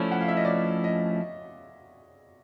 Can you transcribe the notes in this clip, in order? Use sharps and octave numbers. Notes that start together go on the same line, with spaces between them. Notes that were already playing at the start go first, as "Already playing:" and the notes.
Already playing: F3 A3 C#4 E4 C#5 D5
F#5
F5
E5
D#5
D5
D#5